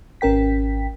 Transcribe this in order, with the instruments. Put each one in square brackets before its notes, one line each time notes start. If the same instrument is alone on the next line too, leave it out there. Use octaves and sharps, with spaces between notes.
[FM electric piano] G#1 C#4 A#4 G5 B6